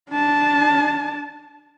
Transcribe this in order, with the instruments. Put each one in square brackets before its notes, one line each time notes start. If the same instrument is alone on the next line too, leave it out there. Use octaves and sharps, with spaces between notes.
[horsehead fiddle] D4 A5